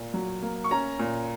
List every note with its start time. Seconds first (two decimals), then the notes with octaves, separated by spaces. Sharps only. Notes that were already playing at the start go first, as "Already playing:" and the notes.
Already playing: A#2
0.14 F#3
0.42 A#3
0.64 C#6
0.71 C#4 A#5
0.99 A#2